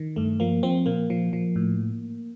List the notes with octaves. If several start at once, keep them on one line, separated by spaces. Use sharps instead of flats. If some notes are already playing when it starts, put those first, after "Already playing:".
Already playing: D#3
G2 A3
F3 A#3
F3 C4
A#2 A#3
F3
F3
A2